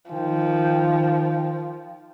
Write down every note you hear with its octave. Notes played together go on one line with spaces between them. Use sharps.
D#3 F3 G5